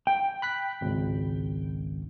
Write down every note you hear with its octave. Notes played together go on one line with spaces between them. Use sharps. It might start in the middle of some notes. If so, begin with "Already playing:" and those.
G5
B5 F#6 B6
G#1 C#2